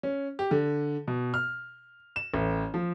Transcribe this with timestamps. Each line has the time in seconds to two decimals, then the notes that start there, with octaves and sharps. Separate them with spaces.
0.03 C#4
0.39 G4
0.51 D3
1.08 B2
1.34 F6
2.16 E7
2.34 A1
2.74 F3